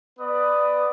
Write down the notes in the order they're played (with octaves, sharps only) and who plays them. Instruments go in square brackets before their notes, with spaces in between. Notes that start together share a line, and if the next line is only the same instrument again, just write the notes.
[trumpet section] B3 B4 D5 D#6